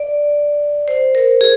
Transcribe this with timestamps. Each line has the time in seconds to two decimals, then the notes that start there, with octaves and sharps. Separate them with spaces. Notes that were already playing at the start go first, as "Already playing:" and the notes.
Already playing: D5
0.88 C5
1.15 A#4
1.41 G#4